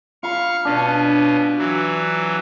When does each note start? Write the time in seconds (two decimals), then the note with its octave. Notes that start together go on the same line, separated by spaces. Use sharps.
0.23 F4 F5 B5 C#6
0.65 B2 C#4 D4
1.58 E3 F#3